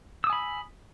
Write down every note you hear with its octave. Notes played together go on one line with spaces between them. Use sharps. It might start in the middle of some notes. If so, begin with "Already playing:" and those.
G#5 B5 D#6 E6